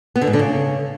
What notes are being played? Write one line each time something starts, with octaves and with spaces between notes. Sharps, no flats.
B3
D3
G#2
D3
C#3